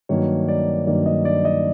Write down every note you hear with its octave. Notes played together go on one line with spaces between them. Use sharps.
G2 D#3 F#3 A#3 C#5
D5
G2 D#3 F#3 A#3 D5
D#5
D5
D#5